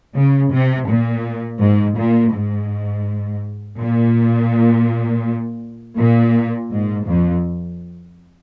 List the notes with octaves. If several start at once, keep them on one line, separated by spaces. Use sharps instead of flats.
C#3
C3
A#2
G#2
A#2
G#2
A#2
A#2
G#2
F2